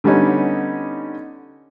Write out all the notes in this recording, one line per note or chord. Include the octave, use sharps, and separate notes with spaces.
D3 G3 B3 C#4 D#4